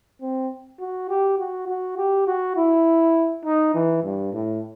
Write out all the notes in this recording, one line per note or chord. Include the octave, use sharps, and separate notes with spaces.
C4
F#4
G4
F#4
F#4
G4
F#4
E4
D#4
E3
G2
A2